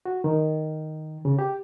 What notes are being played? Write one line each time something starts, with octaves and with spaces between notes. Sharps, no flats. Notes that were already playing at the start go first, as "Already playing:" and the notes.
F#4
D#3
C#3
G4